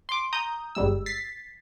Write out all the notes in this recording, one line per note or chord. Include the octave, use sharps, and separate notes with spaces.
C6 D6
A#5 D#6 G6
G1 G3 G#3 E6
A6 B6 C7